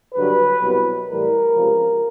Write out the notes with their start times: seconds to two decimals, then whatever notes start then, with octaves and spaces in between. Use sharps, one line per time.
0.15 G2 D3 F#3 B4
0.61 C2 B2 F#3
1.08 A2 E3 G3 A#4
1.54 C#2 C3 F3